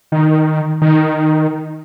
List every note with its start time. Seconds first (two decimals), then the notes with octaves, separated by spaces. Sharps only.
0.12 D#3
0.82 D#3